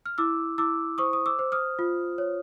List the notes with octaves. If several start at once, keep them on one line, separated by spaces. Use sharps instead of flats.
F6
E4 D6 E6
E4 D6 E6
C5 C#6 D#6
D#6
D6 E6
C5
D#6 F6
F4
C#5